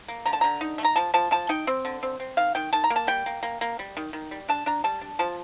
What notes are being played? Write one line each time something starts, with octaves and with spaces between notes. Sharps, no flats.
A#3
D3 A#5
A5
D3 A#5
D#4
A3
A#5
F3 A5
F3 A5
F3 A5
D#4 G5
C4
D3
C4
C4
D#3 F5
D#3 G5
D#3 A5
A#5
A#3
A5
G3 G5
A#3
A#3
A#3
G3
D#3
D#3
G3
D4 A5
D4 A#5
G3 A5
D4
F3 A5